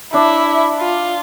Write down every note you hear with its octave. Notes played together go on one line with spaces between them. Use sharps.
D4 E4
F4